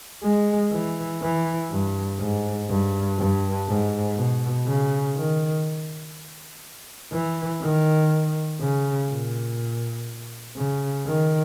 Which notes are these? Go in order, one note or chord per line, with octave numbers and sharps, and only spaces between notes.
G#3
E3
E3
G2
G#2
G2
G2
G#2
B2
C#3
D#3
E3
D#3
C#3
A#2
C#3
D#3